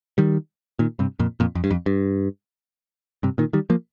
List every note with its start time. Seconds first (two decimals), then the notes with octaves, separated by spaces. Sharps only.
0.18 D#3 G3
0.79 A#2 D#3
0.99 G2 C3
1.19 F2 A#2
1.40 F2 A#2
1.55 F2
1.64 G2
1.71 F2
1.86 G2
3.23 G2 C3
3.38 A#2 D#3
3.53 D#3 G3
3.70 F3 A#3